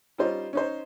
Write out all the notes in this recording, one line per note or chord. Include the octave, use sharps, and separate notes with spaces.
G3 C#4 D#4 F4 C5
C#4 D#4 C5